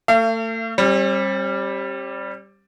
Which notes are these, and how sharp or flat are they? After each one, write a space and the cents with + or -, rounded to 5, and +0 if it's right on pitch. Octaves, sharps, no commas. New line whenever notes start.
A3 +35 F5 -45
G3 +0 C4 +45